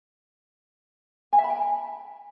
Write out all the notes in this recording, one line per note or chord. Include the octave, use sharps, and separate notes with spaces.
G#5
E5
B5
G5
A5